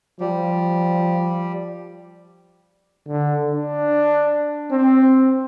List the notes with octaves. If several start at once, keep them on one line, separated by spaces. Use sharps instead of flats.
F3 G3
D3
D4
C4